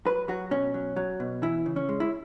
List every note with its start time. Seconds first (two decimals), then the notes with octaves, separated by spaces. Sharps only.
0.06 F#3 B4
0.28 F#3 F#4
0.51 B2 C#4
0.74 F#3
0.96 F#3
1.20 B2
1.42 E3 E4
1.66 C#3
1.76 C#4
1.89 G#3
2.00 E4